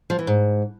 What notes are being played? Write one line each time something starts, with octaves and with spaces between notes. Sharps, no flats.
F3
E3
G#2